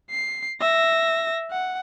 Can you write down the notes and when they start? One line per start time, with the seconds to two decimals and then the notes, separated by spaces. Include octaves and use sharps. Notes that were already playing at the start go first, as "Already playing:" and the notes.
0.11 C7
0.61 E5 A#6
1.51 F#5